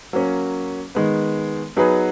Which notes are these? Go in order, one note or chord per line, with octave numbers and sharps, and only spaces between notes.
F#3 A#3 C#4
D#3 G#3 B3
F#3 B3 D#4 G#4 B4